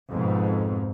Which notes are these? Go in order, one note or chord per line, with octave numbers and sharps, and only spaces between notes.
F2 G#2 B2